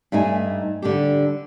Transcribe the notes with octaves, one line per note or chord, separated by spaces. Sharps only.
G2 A3 D#4 G#5
D3 G3 D4 G4